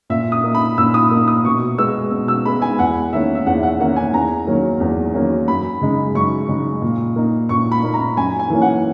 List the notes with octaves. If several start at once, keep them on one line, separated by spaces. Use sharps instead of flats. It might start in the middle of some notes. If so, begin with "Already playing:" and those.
A#2 E5
D#6
A#3 D#4
B5
A#2 E6
D#6
A#3 D#4
D#6
B2 C#6
G#3 B3 E6
B2
E6
G#3 B3 B5
G#5
E2 F#5
D#3 A#3 C#4 E5
E5
E2 F#5
F#5
D#3 A#3 C#4 F#5
G#5
E2 A#5
D#3 F#3 A#3 C#4
E2
D#3 F#3 A#3 C#4
F#2 B5
C#3 G#3 D#4
F#2 C#6
C#3 G#3 D#4
A#2
A#3 D#4
A#2 C#6
B5
A#3 D#4
A#5
F#2 G#5
G#5
E3 A#3 C#4
F#5